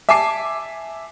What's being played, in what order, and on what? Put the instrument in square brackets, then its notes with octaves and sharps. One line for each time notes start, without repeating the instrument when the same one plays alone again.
[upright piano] E5 G#5 A5 D6 C7